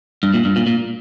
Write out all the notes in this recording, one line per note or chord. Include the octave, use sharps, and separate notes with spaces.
G2
A#2
G2
A#2
A#2